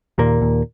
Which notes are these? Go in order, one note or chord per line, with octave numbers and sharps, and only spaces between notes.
D#2 A#2 A#3
D#2